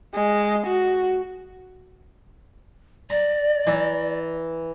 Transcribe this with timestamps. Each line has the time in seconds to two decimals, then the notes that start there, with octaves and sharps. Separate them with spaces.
0.14 G#3
0.67 F#4
3.10 D5 A#5
3.67 E3 A#5